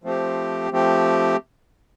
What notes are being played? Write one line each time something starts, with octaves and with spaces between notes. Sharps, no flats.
F3 A3 C4 G4
F3 A3 C4 G4